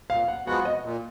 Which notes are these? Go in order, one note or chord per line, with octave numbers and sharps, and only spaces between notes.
A#2 F5
F#5
F3 G#3 B3 F#4 F#5
D#5
A#2